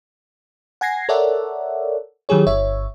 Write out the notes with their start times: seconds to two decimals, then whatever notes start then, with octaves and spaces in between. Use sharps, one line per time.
0.81 F#5 G#5 G#6 A#6 C7
1.09 A4 A#4 C#5 D5 E5 F#5
2.29 D#3 F#3 G4 G#4 C#5
2.47 G1 C#5 E5